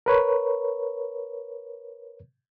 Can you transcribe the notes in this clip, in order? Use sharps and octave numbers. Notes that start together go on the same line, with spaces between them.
A#4 B4 C#5